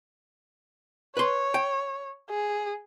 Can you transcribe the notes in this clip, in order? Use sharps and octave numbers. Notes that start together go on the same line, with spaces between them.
B4 C#5 C6
G5
G#4